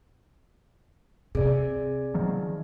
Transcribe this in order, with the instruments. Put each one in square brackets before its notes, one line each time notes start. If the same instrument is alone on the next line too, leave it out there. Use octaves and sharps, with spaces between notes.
[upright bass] C3 [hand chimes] G#4 D5
[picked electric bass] D#3 F3 F#3